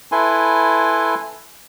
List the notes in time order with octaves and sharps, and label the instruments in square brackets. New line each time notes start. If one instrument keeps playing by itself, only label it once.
[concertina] E4 A4 B4 G#5 C6